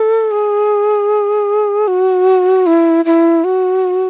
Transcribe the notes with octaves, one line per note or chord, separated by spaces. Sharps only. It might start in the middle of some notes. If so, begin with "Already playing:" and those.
Already playing: A4
G#4
F#4
E4
E4
F#4